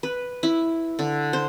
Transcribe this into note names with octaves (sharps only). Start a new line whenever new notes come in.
B4
E4
D3
C5